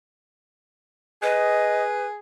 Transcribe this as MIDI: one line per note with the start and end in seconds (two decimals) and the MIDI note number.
1.23 2.20 68
1.23 2.06 71
1.23 1.83 75